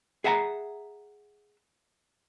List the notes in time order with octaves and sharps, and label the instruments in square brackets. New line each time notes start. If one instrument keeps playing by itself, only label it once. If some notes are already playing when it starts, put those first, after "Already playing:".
[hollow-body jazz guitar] G#4 E5 F#5 G#5 A#5